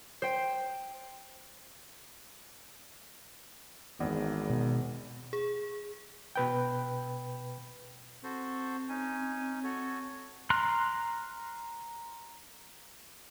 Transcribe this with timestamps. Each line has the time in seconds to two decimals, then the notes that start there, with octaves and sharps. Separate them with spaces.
0.22 C5 G5
4.00 G#1 E2
4.50 B2
5.33 G#4
6.36 B2 B4 G5
8.24 C4 F#4 A4 C5
8.89 C#4 D#4 G#5
9.64 F#4 A4 C#5
10.50 A#5 C6 F6 F#6